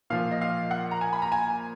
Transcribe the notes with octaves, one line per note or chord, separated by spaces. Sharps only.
A#2 F3 F5
D#5
F5
F#5
A#5
G#5
B5
A#5
G#5